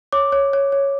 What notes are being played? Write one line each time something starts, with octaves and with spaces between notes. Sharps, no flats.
C#5 D6
C#5
C#5
C#5